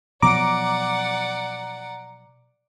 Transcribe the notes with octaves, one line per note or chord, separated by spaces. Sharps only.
B2 F3 F#3 D5 F#5 A#5 D6